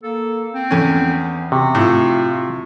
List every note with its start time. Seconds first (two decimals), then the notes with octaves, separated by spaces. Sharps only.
0.03 A#3 A4
0.54 C4
0.71 E2 A3 B3 C#4
1.52 C3 F#4
1.75 A2 F4